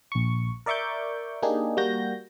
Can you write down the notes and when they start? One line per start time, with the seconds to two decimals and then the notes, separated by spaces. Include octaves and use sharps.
0.12 A#1 C#6
0.66 A#4 D5 E5 C#6 D6 G6
1.42 A#3 D4 D#4 G4 G#4
1.77 G3 A#3 F#4 G6 A#6